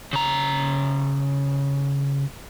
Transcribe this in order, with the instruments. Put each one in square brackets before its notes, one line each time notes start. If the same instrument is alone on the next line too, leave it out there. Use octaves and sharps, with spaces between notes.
[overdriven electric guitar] C#3 A#5